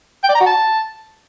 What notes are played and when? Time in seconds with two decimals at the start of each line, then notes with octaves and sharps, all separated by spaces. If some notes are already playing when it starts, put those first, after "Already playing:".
0.24 G5
0.29 D5
0.35 A#5
0.41 F#4
0.46 A5